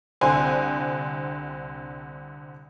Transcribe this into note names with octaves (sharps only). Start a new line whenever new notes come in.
C2 D3 C4 G#5 C6